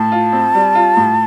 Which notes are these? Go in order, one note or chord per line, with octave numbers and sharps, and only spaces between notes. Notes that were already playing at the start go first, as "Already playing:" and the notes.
Already playing: A2 A5
F4
C4
G3
F4
A2